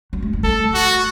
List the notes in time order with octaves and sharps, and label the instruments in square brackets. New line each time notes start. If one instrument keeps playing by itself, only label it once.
[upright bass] F#3
A3
F#3
[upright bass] A3 [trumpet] A4
[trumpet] F#4